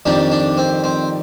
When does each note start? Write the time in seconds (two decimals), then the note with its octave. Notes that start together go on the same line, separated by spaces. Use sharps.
0.06 F2 D#3 G3 D4
0.32 D4
0.58 C4
0.84 C4